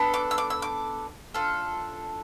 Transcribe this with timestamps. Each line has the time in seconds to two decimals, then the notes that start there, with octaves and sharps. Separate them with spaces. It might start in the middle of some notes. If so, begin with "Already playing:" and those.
Already playing: B3 D4 A4
0.14 D6
0.31 E6
0.38 D6
0.50 E6
0.62 D6
1.34 D4 F4 A4